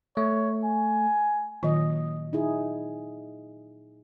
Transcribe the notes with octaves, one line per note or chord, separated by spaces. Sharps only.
A3 C#5
G#5
A#2 D#3 F#3 D#5
D#4 E4 G#4